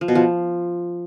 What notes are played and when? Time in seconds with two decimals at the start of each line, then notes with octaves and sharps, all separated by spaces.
0.01 F3
0.08 B2
0.15 F3